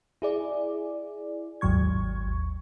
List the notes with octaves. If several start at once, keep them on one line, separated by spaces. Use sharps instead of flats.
E4 G#4 D5
G#1 D#2 G#2 F#3 C#6 G#6